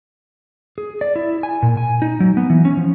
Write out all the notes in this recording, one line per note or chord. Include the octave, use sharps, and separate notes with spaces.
G#4
D5
E4
G#5
A#2
G#5
D#4
F#3
B3
E3
C#4
F3